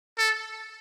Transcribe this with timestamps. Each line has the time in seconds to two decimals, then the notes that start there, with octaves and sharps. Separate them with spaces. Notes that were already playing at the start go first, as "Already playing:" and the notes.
0.18 A4